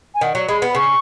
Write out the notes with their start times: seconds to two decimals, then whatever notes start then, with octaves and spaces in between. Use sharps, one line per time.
0.14 G#5
0.21 D#3 F#5
0.35 F#3
0.48 G#3 B5
0.62 B3
0.69 B5
0.75 C#3 C#6